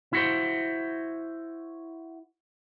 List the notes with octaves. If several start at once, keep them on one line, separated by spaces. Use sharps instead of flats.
E4 F#4 C5